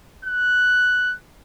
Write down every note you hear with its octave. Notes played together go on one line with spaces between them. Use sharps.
F#6